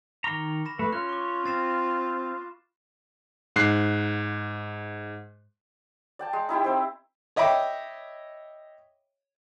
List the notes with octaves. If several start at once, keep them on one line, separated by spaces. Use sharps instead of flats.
D#3 A#5 C#6 D6 F6
B5 A#6 E7
A3 B4
C#4 F4 C#5 F#6
C#6 D6
C4 A6 C7 E7
G#2 F#6 C7
D5 G5 A5
G#3
D#4 E4 G4 G5
C4 C5 E5
C#5 D#5 E5 G5 B5 D6